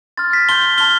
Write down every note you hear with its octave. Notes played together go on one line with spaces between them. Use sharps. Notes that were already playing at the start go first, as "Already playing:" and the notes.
C6 F6 A6
B6
A5 C6 G6 G7
A5 C6 F6 G7